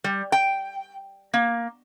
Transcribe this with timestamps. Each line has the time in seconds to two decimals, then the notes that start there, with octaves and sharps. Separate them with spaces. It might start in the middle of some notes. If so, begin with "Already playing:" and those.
0.04 G3
0.32 G5
1.33 A#3